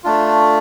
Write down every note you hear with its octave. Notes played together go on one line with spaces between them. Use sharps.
A3 D4 F4